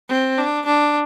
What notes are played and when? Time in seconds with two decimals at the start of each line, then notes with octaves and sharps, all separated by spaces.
0.09 C4
0.38 D4
0.65 D4